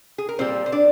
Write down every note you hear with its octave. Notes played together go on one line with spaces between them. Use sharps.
G#4
A#4
A#2 G3 C4 C5
C5
D4 D5